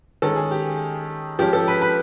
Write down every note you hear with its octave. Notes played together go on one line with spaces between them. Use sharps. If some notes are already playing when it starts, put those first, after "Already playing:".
D#3 G#3 C#4 A4
G#4
G4
F3 G#3 C#4 G4
A4
B4
B4